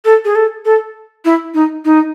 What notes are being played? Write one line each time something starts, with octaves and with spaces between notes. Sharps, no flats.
A4
G#4
A4
A4
E4
D#4
D#4